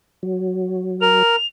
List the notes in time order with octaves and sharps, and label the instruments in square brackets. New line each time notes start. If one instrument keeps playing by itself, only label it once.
[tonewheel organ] F#3
[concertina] A#4 [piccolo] F7